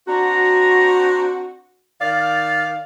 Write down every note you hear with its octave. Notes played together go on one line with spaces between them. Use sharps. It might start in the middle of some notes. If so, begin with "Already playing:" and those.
C4 D4 F#4 A#5
D#3 D5 F5 A6